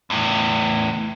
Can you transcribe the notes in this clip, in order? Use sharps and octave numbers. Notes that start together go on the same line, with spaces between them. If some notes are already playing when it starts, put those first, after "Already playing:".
E2 A2